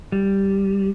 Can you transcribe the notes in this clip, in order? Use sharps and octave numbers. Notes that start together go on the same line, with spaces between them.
G3